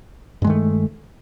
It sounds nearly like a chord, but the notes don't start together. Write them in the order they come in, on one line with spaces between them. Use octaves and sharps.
G2 G#3 D#3 A3